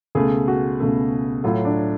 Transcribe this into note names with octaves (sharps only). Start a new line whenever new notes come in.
C#2 B2 A3 G#4
F#4
C#2 B2 A3
A2 F#3 A3 F4
D4